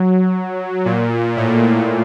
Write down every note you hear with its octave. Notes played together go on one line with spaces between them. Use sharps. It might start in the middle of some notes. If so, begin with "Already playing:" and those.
Already playing: F#3
A#2
A2